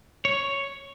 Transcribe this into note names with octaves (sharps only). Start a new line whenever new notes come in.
C#5